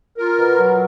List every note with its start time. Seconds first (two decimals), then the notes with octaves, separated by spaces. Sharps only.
0.17 F4 A#4
0.38 B2
0.59 F#3